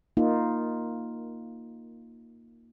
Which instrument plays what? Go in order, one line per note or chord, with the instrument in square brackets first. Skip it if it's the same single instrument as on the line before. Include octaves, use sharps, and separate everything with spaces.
[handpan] A#3 D#4 F4